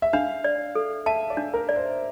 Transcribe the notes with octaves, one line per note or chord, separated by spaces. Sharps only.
E5
D4 F5
D5
A4
E5 A5
D5
D4
A#4
D5
C5